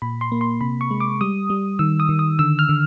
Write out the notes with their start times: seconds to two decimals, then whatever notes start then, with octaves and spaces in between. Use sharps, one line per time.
0.02 A#2 B5
0.21 C6
0.32 A#3
0.41 C6
0.61 C3 B5
0.81 C#6
0.91 G#3
1.00 D6
1.21 G3 D#6
1.50 G3
1.79 D#3 E6
2.00 D#6
2.09 D#3
2.19 D#6
2.39 D3 E6
2.59 F6
2.69 D3